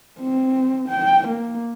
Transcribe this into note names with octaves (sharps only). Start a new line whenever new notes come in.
C4
G5
A#3